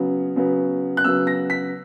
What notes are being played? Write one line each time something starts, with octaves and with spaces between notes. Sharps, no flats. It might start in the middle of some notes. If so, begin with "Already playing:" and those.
Already playing: C#3 F#3 B3
C#3 F#3 B3
F#6
C#3 F#3 B3 E6
A#6
B6